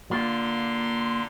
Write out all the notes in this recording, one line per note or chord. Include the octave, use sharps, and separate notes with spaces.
D3 A#3 F4 C6